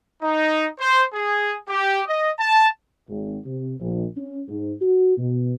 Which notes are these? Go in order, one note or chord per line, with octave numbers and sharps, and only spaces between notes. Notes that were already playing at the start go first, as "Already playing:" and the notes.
D#4
C5
G#4
G4
D#5
A5
G#1
C3
A#1
C#4
G#2
F#4
B2